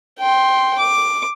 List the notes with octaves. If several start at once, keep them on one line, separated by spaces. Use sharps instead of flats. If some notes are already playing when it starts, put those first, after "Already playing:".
G5 C6
D6